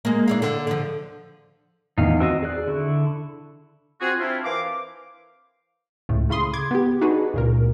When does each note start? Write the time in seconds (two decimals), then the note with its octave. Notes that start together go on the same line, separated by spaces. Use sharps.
0.05 G#3 A#3
0.28 D4 E4 F5
0.42 D3
0.67 D3 F3
1.98 E2 D#3 D#4 F5
2.20 C4 F#4 D#5 E6
2.43 G#4 D5 F#6
2.68 D3 E4 C#6
4.01 C4 F4 F#4 G#4
4.19 C4 D4 E4 F4
4.44 E3 A#4 C5 F5 D6
6.09 C#2 A2
6.29 A2 C#3 B5 C6 D#6
6.53 D6 G#6
6.71 B3 G4
7.01 D4 D#4 F#4 G#4 B4
7.34 C#2 A#2 A#4